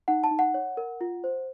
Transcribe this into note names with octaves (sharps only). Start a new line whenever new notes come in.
D#4 F#5
A5
D#4
F#5
C#5
A#4
F4
C5